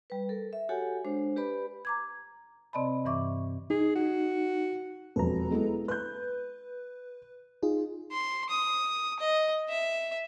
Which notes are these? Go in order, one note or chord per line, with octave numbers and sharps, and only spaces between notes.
G3 B4
A4 A#4
E5
F#4 G4 A4 C#5 F#5 G#5
G#3 D4 C5
G4 B4 D5 B5
A#5 D6 G#6
C3 C4 D5 D#5 A5 B5
G2 E3 E5 C#6 D6
D#4 G#4
F#4
E1 F2 A4 B4 A#5
G#3 B3 E4
B4 F#6 G6
D#4 F4 G#4
C6
D#6
D#5
E5